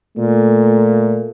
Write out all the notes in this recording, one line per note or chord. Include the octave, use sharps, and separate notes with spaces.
A#2 A3